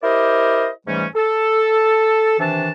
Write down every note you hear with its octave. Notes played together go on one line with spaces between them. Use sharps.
E4 G4 A#4 C5 D5 D#5
G#2 E3 G3 A3 C#4
A4
C3 D#3 E3 D4 A5